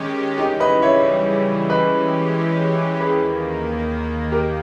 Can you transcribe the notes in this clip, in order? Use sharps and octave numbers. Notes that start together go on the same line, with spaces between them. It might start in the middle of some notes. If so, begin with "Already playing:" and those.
Already playing: D#3 G#3 C#4 G4
C#3 E3 G3 D#4 G4
B4 D#5
C#5 E5
E3 G#3 C#4 G4 B4 D#5
D#2 D#3 A#3 G#4 B4
G4 A#4